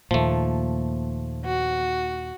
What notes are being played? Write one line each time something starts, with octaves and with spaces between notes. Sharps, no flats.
D#2 A#2 F3 A3
F#4